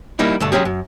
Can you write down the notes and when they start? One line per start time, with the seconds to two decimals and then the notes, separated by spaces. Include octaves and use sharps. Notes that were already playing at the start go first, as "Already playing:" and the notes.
0.19 G3 A#3 D#4 E4
0.40 G2 D3 A3
0.52 F#3 G#3 C#4 G4 G#4
0.65 F#2